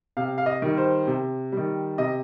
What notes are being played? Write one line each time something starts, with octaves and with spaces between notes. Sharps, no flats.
C3 F5
F5
D#5
D#3 G3
C5
C3
D#3 G3
C3 D#5